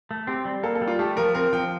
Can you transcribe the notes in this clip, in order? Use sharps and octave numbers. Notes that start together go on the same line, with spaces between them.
A3
C4 G4
G3
A#3 A4
A4
G3
F4
A3 G4
F3 A#4
C4 A#4
F3 G5